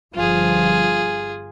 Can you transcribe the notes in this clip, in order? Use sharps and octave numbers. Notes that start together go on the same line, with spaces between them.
G1 G2 F3 F4 G#4